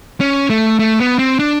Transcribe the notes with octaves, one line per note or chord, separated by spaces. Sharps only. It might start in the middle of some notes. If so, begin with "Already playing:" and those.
C#4
A3
A3
B3
C4
D4